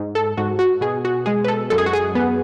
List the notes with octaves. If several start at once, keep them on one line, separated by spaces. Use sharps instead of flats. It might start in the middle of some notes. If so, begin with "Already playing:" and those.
Already playing: G#2
A4
G#2 F#4
F#4
B2 G#4
F#4
G#3 G#4
B4
A4
F#2 A4
G#4
F#4
G#4
B3